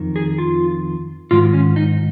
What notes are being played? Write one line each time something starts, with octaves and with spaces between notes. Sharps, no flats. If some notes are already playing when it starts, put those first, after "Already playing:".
Already playing: F2 D#3
G#4
F4
G#2 D#3 F4
C#4
D#4